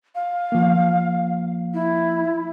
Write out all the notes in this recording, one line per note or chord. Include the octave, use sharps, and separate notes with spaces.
F5
F3 A#3
E4